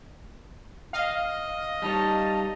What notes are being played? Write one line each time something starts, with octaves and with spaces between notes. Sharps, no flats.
D#5 F5
G3 D#4 C#5 A5